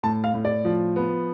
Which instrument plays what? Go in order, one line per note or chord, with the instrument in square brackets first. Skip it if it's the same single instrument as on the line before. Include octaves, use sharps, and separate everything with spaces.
[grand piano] A2 A5
F5
A2
D5
F3
B3